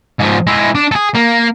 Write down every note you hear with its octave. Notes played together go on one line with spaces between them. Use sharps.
G#2 F3
G#3 E4
D4
G#4 A4
A#3